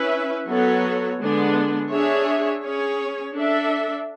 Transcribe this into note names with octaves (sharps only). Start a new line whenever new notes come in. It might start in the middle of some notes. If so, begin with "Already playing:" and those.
Already playing: C#4 E4 B4 E5
F#3 B3 F#4 A4 C#5
D3 G#3 B3 D4
D4 G#4 C#5 E5
C#4 G#4 C#5
D4 A4 E5